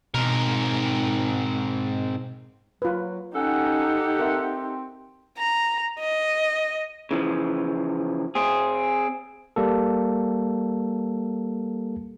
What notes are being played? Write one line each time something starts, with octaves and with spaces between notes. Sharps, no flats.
G#2 B2 C4 A#4 D#5
F#3 F4 B4
C#4 D#4 G4 A4 F#5
C4 A#4 E5
A#5
D#5
C#3 E3 F3
C4 G#4
G3 A#3 A4